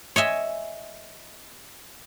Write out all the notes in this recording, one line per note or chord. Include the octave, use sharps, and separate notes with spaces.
C#5 D#5 E5 G#5